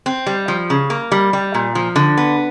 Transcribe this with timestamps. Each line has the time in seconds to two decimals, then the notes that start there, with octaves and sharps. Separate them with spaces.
0.06 C4
0.27 G3
0.48 F3
0.70 C#3
0.90 A#3
1.12 G3
1.33 G3
1.55 A#2
1.75 F3
1.96 D3
2.17 B3